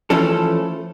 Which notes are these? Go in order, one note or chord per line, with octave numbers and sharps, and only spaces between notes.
E3 F3 A3 C#4 A4